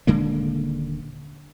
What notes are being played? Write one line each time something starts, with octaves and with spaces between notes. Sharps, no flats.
D#1 D3 G#3 A#3